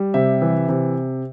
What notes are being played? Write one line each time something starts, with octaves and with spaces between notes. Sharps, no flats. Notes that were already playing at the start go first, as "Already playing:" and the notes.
Already playing: G3
C3 E5
E3
C3